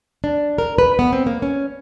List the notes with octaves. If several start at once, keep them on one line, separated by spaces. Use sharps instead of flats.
D4
A#4
B4
B3
C4
A#3
C#4